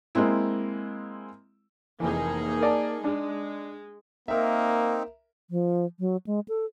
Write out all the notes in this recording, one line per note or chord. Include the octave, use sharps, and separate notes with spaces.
G#3 A#3 C4 E4
F1 E3 A#3 D#4 G#4
A#4 D5 A5
G#3 D4
A#3 C4 D#4 A#4 E5
F3
F#3
G#3
A4